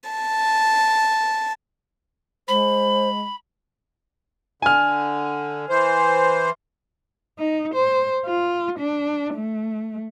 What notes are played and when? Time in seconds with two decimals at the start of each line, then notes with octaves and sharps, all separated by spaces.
0.10 A5
2.48 G#3 C5 B5
4.62 D3 G#5 F6
5.69 E3 C5
7.39 D#4
7.74 C5
8.26 F4
8.78 D4
9.35 A3